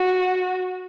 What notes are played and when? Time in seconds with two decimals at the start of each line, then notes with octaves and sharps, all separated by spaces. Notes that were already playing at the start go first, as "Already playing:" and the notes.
Already playing: F#4